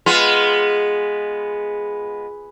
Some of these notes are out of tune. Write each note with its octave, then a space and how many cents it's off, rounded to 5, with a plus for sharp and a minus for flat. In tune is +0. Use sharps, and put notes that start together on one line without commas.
G#3 +0 B3 +0 F4 +0